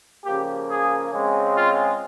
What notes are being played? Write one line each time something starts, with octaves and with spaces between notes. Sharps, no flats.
C#3 F3 A#3 G4
G#4
C#3 G#3 C4
F4